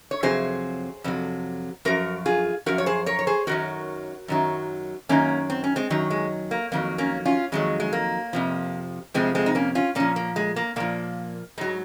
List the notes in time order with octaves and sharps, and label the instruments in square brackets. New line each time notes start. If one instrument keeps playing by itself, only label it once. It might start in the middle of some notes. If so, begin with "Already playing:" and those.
[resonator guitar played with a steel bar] C#5
F2 C3 F#3 G#4 C5
F2 C3 F#3
F#2 F3 F#4 A#4
F4 G#4
F#2 F3 F#4 A#4
C#5
G#4 C5
A#4 C#5
C#5
G#4 C5
F#2 D#3 F#3 F#4 A#4
F#2 D#3 F#3
F#2 D#3 F#3 A#3 C#4
C4
C#4
G#3 C4
F#2 D#3 F#3
G#3
A#3
F2 D#3 F#3 A#3
A#3 C#4
C#4 F4
F2 D#3 F#3 G#3
G#3
A#3
F2 C3 F3
F2 C3 F3 G#3 C4
G#3 C4
D#4
A#3 C#4
C#4 F4
A#2 F3 A#3 C#4
A#3
G#3
A#3
A#2 F3 A#3
G#2 F#3 G#3